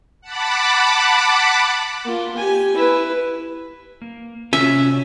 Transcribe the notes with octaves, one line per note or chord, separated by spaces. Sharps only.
F#5 A5 B5 D6
A#3 F4
G4 G#5
E4 B4
A#3
C3 C#4 F4 F#4 E5